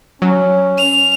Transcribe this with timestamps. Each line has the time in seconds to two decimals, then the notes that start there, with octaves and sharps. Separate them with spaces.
0.22 F#3 C#4
0.78 F7